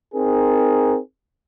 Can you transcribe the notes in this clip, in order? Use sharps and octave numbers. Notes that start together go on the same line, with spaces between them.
C4 D#4 G#4 A#4